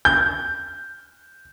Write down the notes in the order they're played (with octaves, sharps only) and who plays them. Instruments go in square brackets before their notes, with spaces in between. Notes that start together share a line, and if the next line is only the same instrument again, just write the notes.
[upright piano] G6